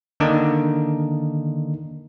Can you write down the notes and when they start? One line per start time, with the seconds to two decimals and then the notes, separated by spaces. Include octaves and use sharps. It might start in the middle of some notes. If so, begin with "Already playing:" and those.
0.20 D3 D#3 A#3 D4 D#4